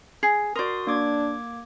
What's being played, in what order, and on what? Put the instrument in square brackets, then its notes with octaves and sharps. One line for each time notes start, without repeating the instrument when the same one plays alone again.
[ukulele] G#4
[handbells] F#4 C6 D#6 [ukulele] A#4 D5
[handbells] A#3 D6 G#6 [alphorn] D4